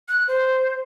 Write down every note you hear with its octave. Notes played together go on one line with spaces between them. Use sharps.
F#6
C5